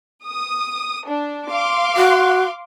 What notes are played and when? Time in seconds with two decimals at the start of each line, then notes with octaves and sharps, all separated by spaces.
0.25 D#6
1.08 D4
1.48 F5 C6 D6
1.96 F#4